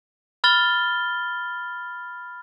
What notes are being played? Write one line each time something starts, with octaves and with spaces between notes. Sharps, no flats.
B5 F6 A6 G7